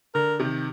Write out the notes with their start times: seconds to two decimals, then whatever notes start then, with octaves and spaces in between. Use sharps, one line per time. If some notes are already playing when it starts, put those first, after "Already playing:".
0.15 D3 A#4
0.39 C3 D#3